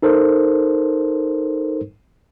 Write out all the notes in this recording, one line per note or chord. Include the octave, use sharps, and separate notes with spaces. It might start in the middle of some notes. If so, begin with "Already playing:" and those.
D#4 A4 A#4 C5